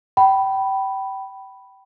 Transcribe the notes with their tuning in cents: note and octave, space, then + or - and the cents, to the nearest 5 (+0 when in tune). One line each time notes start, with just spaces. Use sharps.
G5 -25 B5 +0